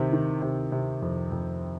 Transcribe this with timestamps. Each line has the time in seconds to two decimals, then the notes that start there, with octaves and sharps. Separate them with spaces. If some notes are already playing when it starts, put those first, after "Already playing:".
Already playing: C3 D#3
0.13 D#3
0.42 C3
0.72 C3
1.02 F2
1.32 F2